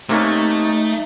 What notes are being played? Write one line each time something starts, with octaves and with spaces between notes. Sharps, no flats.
C3 A3 A#3 C#4 D#4